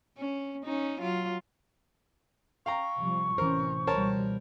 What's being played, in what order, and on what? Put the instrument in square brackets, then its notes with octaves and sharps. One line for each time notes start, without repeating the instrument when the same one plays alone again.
[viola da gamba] C#4
C#4 D#4
F#3 F4
[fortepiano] F5 G5 A#5 [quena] C#6
[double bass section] C3 F3 G3
[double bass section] A1 C3 C#4 [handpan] E3 C5 [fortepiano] A#4
[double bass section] C#2 B2 G3 [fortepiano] A#4 C#5 A5 [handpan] C5